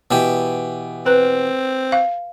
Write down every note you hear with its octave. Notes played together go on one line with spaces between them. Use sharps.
B2 E3 G4
C4 B4
F5